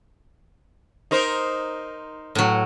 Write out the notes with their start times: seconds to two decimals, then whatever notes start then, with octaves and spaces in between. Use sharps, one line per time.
1.11 D#4 A#4 C5
2.35 A2 F#3